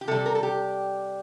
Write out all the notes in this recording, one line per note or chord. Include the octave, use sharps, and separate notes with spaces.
G4
C3 G3 A4
A#4
A4
G4